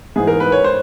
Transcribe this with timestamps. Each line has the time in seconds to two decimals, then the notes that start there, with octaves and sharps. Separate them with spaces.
0.16 G#2 E3 G#4
0.27 A#4
0.40 B4
0.52 C#5
0.64 C5